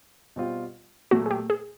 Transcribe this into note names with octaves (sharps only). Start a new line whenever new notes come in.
B2 G3 C4 F4
A#2 F#3 A3 F#4
G#4
G4
G#4